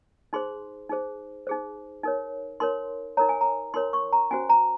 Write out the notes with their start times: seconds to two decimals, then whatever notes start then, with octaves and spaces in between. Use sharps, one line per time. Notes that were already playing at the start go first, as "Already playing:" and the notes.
0.33 D#4 G#4 C5 C6
0.89 D#4 G#4 C5
1.47 D#4 G#4 C5
2.03 D#4 A#4 C#5
2.60 D#4 A#4 C#5 C6
3.17 D#4 A#4 C#5 A#5
3.29 G#5
3.41 A#5
3.74 D#4 A#4 C#5 C6
3.93 C#6
4.13 A#5
4.31 C#4 F#4 C5 G#5
4.50 A#5